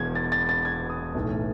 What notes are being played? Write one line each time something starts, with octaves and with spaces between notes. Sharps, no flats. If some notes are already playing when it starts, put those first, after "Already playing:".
Already playing: E1 E2 B2 G#6
A6
A6
A6
G#6
D#6
B1 A2 E3 A3